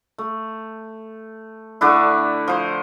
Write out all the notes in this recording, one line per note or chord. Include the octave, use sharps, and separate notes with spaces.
A3
D3 A3 D4 E4
F3 C5